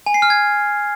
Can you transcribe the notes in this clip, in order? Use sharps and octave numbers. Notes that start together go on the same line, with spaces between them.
G#5
C7
F6
G#6